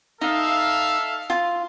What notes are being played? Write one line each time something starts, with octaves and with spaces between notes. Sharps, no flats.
D#4 A4 E5 F5
F4